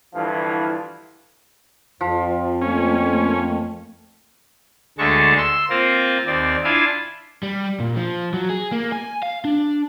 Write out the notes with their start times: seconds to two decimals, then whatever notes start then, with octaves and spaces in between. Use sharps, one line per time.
0.15 G2 D3 E3 F3 E4 F4
2.01 F2 F3
2.62 A3 A#3 C#4
4.98 D2 D3 G#3 A3 A5 C#6
5.37 C6 E6
5.69 A#3 C4 F4 A#4
6.26 D#2 C4 D5
6.64 D4 E4 F4 F5 G#5
7.43 G3
7.80 A#2
7.96 F3
8.34 F#3
8.49 G#4
8.72 A#3
8.92 G#5
9.23 F5
9.45 D4